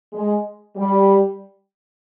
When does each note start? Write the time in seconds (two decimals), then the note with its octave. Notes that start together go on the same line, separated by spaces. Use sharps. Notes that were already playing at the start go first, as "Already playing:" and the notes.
0.13 G#3
0.76 G3